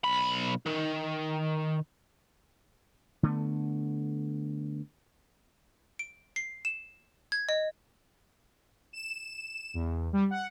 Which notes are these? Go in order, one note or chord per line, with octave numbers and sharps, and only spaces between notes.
B1 B5
D#3
D3 A3 B3
D7
C7
E7
G#6
D#5
E7
E2
G3
F#5